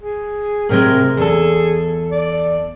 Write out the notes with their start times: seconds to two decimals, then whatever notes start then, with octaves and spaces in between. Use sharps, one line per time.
0.02 G#4
0.69 A2 C3 G#3 A#4
1.17 E2 G#4 A4
2.11 D5